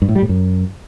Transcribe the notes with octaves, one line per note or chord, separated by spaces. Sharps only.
G2
A2
G3
A2
F#2